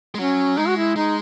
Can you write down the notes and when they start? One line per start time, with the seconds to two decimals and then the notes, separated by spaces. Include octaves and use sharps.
0.15 G#3
0.19 F#3 C#4
0.57 G#3 D#4
0.68 F#4
0.77 E4
0.96 G#3 D#4